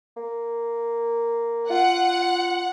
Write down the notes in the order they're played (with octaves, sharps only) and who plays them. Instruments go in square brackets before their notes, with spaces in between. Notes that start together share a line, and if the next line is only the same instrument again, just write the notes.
[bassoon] A#3
[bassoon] F4 [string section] F#5